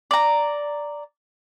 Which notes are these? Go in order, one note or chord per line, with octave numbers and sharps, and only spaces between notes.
D5 A#5